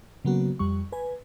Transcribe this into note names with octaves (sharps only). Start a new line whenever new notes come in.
C#3 F#3 A#3 B3 F#4
F2 G3 C#6
B4 G#5